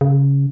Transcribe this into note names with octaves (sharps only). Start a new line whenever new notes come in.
C#3